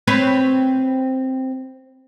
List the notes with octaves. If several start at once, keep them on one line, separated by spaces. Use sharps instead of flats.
C4 B4 C#5